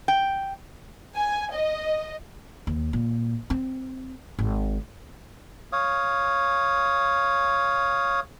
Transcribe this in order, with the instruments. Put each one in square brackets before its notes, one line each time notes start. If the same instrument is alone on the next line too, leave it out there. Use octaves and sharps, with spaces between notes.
[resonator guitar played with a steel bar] G5
[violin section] G#5
D#5
[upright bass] D#2
A#2
C4
G#1
[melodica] C#5 F5 D#6